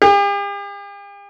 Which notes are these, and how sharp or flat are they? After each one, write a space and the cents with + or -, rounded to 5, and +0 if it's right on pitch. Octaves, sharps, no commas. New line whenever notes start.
G4 +45